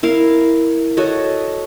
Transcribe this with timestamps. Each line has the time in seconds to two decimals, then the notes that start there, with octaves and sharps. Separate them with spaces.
0.03 E4 A#4 F5
0.97 F#4 A4 C#5 D#5